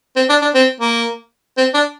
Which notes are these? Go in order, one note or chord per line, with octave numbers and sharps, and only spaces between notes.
C4
D4
D4
C4
A#3
C4
D4